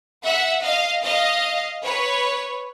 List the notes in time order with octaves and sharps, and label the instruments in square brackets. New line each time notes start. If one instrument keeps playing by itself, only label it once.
[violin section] E5 F#5
D#5 F5
D#5 F5
B4 C#5